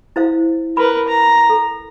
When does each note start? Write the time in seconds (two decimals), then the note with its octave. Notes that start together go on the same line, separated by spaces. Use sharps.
0.16 E4 C5 F5
0.77 A#4 B4 B5
1.08 A#5
1.50 A4